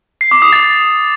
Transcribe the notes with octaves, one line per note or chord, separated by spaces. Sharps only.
C7
D6
D#6
A6